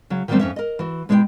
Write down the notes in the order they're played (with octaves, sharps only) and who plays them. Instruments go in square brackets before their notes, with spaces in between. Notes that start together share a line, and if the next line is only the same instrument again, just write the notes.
[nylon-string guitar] C#3 F#3
D#3 E3 F#3 G3 A3 C4
F2 C#4 E5
A#4 D#5
E3 F#4
B2 G#3 E4 G4 C#5 G5